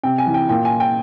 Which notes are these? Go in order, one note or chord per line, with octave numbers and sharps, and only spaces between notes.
C3 G5
G#5
E3
G5
A#2 G5
G#5
G5